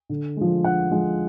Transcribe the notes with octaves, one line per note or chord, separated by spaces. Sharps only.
D3
F3 G#3
D3 F#5
F3 G#3